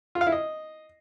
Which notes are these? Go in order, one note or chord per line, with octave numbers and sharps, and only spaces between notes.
F4
F5
E4
D#5